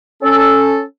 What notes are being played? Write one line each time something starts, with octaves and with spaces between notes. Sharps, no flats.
C#4 A4